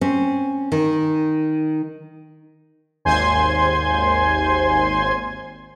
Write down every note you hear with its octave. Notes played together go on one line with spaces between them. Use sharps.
C4 C#4
D#3
G#1 D#2 C5 G#5 C6 G#6